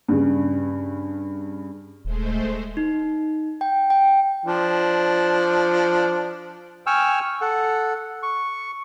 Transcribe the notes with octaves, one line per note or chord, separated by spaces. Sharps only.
G2 C#3
D#1 G#3 A3 C5
D#4
G5
G5
F3 D4
G5 G#5 C#6 E6 F6
A4 F#5
C#6